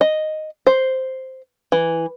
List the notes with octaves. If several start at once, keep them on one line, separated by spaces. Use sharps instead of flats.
D#5
C5
E3